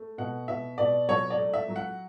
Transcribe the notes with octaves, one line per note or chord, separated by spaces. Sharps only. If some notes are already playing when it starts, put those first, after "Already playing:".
Already playing: A3
B2 F#5
B2 E5
B2 D5
F#3 C#5
D5
A3
E5
F#3
F#5